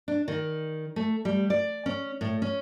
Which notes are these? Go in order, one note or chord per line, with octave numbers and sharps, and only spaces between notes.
D4
D#3
A3
G3
D5
C#4
A2
C#4